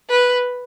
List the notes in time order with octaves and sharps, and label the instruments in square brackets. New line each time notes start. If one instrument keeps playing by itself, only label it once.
[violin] B4